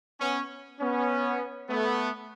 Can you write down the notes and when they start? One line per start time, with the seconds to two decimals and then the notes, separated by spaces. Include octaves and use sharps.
0.20 B3 C#4
0.80 B3 C#4
1.68 A3 B3